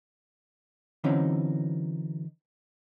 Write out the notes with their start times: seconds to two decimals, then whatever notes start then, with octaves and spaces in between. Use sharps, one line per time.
1.04 D3 E3 F#3 C4 C#4 D#4